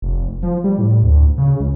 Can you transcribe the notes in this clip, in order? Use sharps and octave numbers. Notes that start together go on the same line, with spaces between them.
F1
F3
G3
A2
D2
C#3
C#2